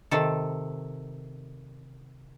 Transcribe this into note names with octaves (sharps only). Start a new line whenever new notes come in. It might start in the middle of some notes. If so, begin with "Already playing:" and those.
C3 D#3 A4